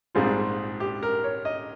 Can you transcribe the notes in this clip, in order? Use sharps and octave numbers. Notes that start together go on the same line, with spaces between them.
A#1 G#2 G3 C4 F4 G#4
G4
A#4
C#5
D#5